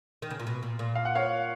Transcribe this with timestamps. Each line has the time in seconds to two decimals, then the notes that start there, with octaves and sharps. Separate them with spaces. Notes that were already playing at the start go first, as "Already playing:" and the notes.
0.22 D#3
0.30 C#3
0.40 A#2
0.47 B2
0.63 A#2
0.79 A#2
0.95 F5
1.05 F#5
1.15 C#5 F5